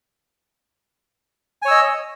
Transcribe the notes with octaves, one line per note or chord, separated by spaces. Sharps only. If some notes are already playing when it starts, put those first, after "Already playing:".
C#5 D#5 G#5 E6